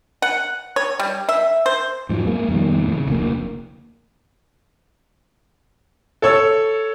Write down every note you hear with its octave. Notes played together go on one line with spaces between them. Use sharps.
F#5
C#5
G3
E5
C5
F2 G#2 F3 F#3
G#3 A#3
F2 B2 D#3 G3
D#2 A2
C#3
F1 D2 A#3
A4 C#5 E6